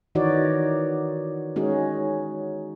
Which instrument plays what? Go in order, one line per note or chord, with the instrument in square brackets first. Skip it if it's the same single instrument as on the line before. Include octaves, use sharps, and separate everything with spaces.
[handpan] D#3 E3 D#4 F#4 C#5 D5
G#3 C#4 D#4 F#4 G#4